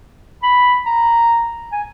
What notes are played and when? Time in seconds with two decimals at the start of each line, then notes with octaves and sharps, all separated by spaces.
0.43 B5
0.86 A#5
1.72 G#5